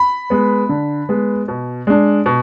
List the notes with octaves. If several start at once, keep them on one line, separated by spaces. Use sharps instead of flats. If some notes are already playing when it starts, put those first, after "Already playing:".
Already playing: B5
G#3 B3
D3
G#3 B3
B2
G#3 D4
B2